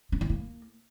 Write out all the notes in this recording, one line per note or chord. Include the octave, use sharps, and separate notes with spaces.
C#4
E4
A#3